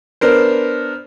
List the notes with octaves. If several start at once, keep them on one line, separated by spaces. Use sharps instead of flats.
B3 D4 A#4 C5